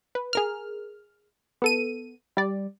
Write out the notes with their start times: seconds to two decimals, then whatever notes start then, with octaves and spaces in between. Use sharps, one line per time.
0.15 B4
0.33 G#4 A#4 F6
1.62 B3 A4 D#7
2.37 G3 D5